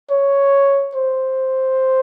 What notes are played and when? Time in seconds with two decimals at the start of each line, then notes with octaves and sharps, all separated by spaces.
0.11 C#5
0.95 C5